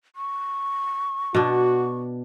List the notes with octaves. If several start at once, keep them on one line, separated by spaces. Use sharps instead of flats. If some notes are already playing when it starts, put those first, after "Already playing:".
C#6
B2 D4 F#4